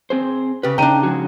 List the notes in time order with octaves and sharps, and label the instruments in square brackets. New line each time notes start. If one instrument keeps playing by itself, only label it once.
[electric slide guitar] C4 G#4 C5
[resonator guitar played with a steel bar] C#3 G4 [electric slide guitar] B4
[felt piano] C#3 D#4 D#7 [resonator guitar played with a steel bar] D4 A#5 [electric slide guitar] G5
[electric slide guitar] F3 G#3 F#4